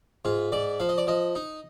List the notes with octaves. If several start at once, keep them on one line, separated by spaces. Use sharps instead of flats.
G#2 F4
G#2 D5
F3 F5
D#5
D5
F3 D#5
D#4